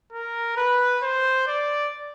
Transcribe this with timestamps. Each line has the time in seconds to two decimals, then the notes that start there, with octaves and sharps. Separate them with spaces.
0.12 A#4
0.57 B4
1.02 C5
1.47 D5